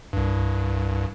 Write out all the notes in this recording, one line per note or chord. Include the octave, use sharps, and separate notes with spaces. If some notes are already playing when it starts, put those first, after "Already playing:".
C2 G2